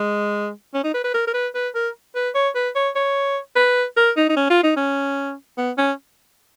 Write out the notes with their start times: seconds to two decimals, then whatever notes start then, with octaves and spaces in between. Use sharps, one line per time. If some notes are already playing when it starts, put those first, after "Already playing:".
Already playing: G#3
0.74 C#4
0.84 D#4
0.94 B4
1.04 B4
1.14 A#4
1.27 A#4
1.34 B4
1.55 B4
1.75 A#4
2.15 B4
2.35 C#5
2.55 B4
2.76 C#5
2.96 C#5
3.56 B4
3.97 A#4
4.17 D#4
4.29 D#4
4.37 C#4
4.50 F4
4.64 D#4
4.77 C#4
5.58 B3
5.78 C#4